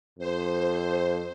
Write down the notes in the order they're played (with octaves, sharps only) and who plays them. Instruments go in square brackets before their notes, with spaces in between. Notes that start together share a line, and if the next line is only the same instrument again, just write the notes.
[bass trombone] F2 [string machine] C5